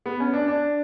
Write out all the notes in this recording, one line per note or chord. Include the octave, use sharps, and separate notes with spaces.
B3
C#4
D4
D4